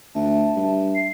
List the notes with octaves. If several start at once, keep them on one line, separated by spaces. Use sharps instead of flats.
D2 E5 A5
G2
C7